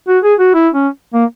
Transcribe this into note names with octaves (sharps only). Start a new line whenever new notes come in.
F#4
G#4
F#4
E4
C#4
A#3